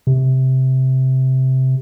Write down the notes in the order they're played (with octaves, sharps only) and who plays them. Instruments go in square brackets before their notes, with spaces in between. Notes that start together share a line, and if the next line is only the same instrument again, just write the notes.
[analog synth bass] C3